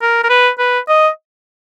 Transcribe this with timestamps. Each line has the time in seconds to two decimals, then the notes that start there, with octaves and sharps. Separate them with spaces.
0.01 A#4
0.24 A#4
0.30 B4
0.59 B4
0.88 D#5